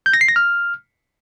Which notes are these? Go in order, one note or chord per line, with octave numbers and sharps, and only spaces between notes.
G6
A#6
C7
A#6
F6